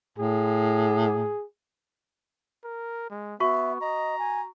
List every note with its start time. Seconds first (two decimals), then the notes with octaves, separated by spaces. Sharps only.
0.18 A2 G#4
2.64 A#4
3.10 G#3
3.40 B3 F#4 E5 C#6
3.81 D#5 A#5
4.19 G#5